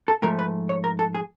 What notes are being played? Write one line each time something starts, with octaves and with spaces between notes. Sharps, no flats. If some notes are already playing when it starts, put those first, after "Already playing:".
A4
G#2 F3 A3 A#4
B4
C#5
A#4
A4
G#4